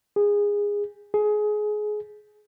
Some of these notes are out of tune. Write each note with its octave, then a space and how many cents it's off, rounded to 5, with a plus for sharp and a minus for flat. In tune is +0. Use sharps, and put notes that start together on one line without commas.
G#4 -20
G#4 +20